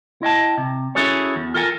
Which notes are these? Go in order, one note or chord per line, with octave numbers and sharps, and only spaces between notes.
E4 D#5 G5 A5
C3
C#4 E4 F#4 G#4 A4 C#5
E2
F4 A4 A#4 G5 G#5